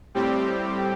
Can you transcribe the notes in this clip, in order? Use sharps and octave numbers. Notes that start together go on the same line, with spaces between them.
A2 G3 C4 G4